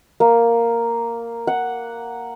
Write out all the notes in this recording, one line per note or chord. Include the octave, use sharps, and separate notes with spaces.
A#3
F#5